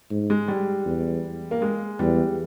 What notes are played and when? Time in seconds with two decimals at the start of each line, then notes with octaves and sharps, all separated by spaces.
0.11 G#2
0.30 G#3
0.48 G3
0.86 E2
1.51 A#3
1.62 G#3
1.99 E2 G3